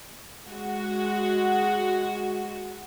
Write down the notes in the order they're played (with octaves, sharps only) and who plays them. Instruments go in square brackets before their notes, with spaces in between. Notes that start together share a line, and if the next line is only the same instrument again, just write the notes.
[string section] G#3 F#4